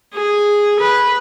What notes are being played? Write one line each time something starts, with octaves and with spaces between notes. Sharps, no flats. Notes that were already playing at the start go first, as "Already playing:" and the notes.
G#4
B4